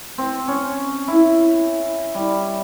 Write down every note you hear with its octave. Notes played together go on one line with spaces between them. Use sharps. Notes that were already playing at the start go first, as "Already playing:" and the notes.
C4
C#4
E4
G3